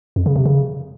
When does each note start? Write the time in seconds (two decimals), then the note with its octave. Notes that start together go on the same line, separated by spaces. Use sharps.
0.16 F2
0.26 C#3
0.36 C3
0.45 C#3